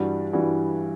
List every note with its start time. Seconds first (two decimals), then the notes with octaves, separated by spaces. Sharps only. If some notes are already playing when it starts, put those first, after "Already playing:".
Already playing: G2 E3 G3 D4 F#4
0.33 G2 E3 G3 D4 F#4